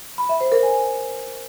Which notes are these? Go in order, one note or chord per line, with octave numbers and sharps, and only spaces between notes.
B5
E5
C5
A#4
G#5